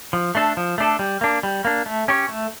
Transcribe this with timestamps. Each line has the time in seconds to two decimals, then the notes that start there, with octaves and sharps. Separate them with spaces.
0.13 F3
0.35 A3 D4 A4
0.57 F3
0.78 A3 D4 A4
0.99 G3
1.21 A#3 D4
1.43 G3
1.65 A#3 D4
1.86 A3
2.08 C#4 G4 C#5
2.29 A3